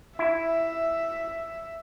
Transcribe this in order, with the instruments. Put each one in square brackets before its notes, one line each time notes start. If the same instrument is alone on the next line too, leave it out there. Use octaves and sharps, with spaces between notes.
[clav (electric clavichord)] E4 [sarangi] E5